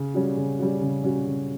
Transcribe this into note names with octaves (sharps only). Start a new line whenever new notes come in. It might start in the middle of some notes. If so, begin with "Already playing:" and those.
Already playing: C#3
G3 C#4 F#4
C#3
G3 C#4 F#4
C#3
G3 C#4 F#4
C#3